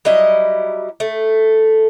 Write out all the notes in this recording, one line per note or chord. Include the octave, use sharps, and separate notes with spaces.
F#3 G3 E4 D#5
A3